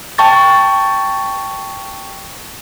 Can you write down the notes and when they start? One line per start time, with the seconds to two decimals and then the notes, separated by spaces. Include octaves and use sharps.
0.18 G5 A5 C#6 A6